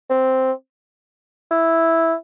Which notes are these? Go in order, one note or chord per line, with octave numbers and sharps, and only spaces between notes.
C4
E4